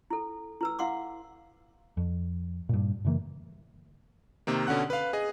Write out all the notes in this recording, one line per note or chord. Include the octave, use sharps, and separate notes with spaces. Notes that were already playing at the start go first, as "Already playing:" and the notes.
E4 A4
E4 B4 E6
E4 F5 F#5 C6 D6
F2
G2 A#2
F#2 C#3 E3 A#3
C3 D#3 A#3
B2 D3 C#4 F#5 F#6
B4 F5
G#4 D#5